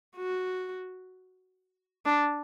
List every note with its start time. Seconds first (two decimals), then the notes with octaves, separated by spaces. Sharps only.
0.16 F#4
2.06 D4